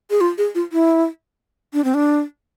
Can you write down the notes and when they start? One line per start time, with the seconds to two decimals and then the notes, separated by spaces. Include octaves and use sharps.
0.11 G#4
0.21 F4
0.38 G#4
0.55 F4
0.72 E4
1.74 D4
1.84 C4
1.94 D4